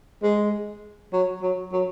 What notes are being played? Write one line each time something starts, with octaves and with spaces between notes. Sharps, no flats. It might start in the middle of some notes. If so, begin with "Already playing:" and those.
G#3
F#3
F#3
F#3